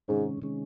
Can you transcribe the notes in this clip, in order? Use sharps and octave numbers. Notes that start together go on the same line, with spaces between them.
G#2 C3 D#3 G#3 C#4
C3 D#3 G#3 C#4